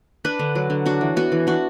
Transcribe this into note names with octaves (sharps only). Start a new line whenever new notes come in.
D4 B4
D3
F#3
D3
D4 F#4
E3
B3 F#4
E3
D4 F#4